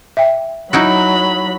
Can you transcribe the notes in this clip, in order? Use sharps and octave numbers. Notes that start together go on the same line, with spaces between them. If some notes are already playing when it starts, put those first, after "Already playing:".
E5 G5
F#3 D#4 E4 F#4 B5